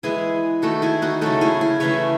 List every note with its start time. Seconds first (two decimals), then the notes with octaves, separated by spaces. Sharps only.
0.03 E3 G#3 B3 E4 G#4
0.62 D#3 A3 F#4 A4
0.82 E4 G#4
1.02 D#4 F#4
1.21 C#3 F#3 A3 F#4 A4
1.41 E4 G#4
1.61 E4 G#4
1.80 C#3 E3 A3 C#5 E5